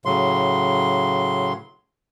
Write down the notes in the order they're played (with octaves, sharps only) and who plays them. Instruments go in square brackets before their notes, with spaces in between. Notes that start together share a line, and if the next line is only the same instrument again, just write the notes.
[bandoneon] A2 C#3 F#3 C6